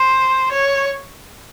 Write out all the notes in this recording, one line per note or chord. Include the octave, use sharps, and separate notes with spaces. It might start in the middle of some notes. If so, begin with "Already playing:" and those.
Already playing: C5
C#5